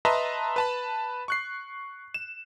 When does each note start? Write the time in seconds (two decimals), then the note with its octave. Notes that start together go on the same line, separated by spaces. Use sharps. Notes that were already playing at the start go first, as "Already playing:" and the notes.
0.05 B4 D#5 E5 A5 A#5 C6
0.56 B4 A5 B5
1.28 C#6 F#6 C7
2.14 E7